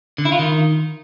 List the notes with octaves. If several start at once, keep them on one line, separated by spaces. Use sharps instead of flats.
D3
E4
F4
D#3